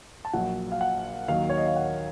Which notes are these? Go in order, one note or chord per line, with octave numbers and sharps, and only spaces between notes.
A5
A#1 A#2 F#3 F#5
F5
F#5
D#2 D#3 F#3 F5
C#5
D#5
F5
F#5